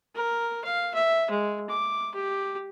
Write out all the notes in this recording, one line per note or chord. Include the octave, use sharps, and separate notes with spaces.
A#4
F5
E5
G#3
D6
G4